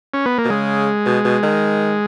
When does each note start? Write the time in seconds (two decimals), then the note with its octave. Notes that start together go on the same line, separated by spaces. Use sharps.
0.14 C#4
0.26 B3
0.38 A#3
0.45 B2
0.50 C#3 G#3
1.06 B2
1.24 B2
1.42 D#3